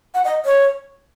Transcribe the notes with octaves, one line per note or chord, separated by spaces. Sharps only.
F#5
D#5
C#5